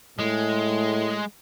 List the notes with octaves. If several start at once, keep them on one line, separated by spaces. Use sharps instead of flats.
A2 G#3